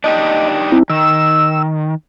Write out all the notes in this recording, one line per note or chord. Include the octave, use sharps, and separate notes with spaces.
D4 D#4 G4 D#5
C4 E4
D#3 E6